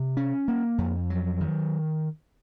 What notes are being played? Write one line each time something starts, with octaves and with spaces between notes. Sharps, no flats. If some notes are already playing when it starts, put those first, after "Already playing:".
Already playing: C3
C#4
A#3
F2
F#3
D#3